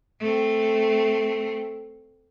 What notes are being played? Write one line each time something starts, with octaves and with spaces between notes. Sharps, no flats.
A3 C4